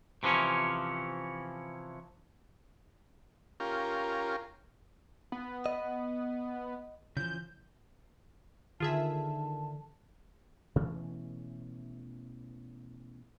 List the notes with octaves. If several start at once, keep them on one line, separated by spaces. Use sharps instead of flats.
C3 E3 F3 C#4
C#4 F4 G4 A#4
B3
D#5
C#3 E3 F3 G6
D3 D#3 F4 G#4 E5 A5
B2 E3 A3 C#4